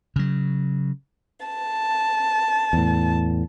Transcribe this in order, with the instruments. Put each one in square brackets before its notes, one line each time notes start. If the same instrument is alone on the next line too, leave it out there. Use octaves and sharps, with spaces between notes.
[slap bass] C#3 F#3
[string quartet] A5
[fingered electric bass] E2 A2